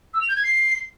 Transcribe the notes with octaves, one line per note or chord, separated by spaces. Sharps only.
E6
F7
G6
G#6
C7